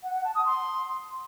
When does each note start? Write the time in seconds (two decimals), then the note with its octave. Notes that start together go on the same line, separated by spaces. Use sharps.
0.03 F#5
0.14 F#5
0.25 A5
0.35 D#6
0.46 C6